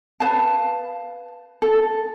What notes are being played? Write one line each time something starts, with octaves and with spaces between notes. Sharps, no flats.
B4 F5 A5
A4